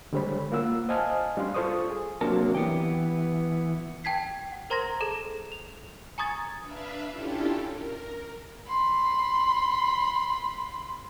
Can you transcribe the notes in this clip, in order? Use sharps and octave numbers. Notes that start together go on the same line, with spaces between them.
D3 G3 G#3 C5 C#5 B5
A#3 F4 F#5 E6
C5 D#5 F5 G#5 A5 F6
G3 C#4 D4 F5 C6
F4 A4 C5 C#6 D#6
G#4
C3 F#3 A#3 D4 A#4 A5
E3 B3 G4
G5 A5 G#6 B6 C7
F#5
A#4 C5 A#5 C6 G#6 A#6
G#4 A4 A5
F7
G#5 A#5 C#6 D#6 G#6 A6
D4 B4 E5 F5
C#4 D4 E4 F4 G4 A4
A#4
B5 C6